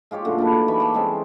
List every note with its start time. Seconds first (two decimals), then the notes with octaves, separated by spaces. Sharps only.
0.11 G#3 F4 G4 C#5
0.25 F#2 A#2 D3 A3
0.38 D4 D#4 B4
0.68 E3 A#3 B5 C#6
0.80 D5 A5
0.94 G3 G#3 C4 C#4